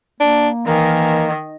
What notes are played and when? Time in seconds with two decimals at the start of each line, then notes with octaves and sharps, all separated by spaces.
0.20 A#3 D4
0.67 D#3 E3 A#3